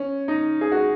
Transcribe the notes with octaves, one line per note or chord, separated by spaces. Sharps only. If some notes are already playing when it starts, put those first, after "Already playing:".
Already playing: C#4
D#4
G#4
F#4